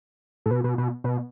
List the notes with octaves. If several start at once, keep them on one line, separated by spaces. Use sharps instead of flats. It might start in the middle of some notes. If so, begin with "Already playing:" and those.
A2
B2
B2
B2
B2